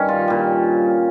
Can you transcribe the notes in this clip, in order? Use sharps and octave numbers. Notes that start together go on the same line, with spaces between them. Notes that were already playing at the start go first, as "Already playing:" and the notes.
Already playing: G2 D#3 G3 C#4
F4
A#2 G3